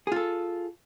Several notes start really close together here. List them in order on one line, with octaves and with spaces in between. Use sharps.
G#4 F4 A4